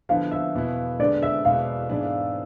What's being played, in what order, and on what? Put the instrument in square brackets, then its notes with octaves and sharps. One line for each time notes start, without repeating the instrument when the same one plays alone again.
[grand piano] D3 F3 B3 E4 [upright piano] F5
[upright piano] E5
[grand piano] E2 B2 B3 E4
[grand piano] D3 G#3 B3 [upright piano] D5
[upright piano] E5
[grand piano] E2 B2 G#3 B3 [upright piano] F5
[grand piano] G#2 E3 B3 D4 G#4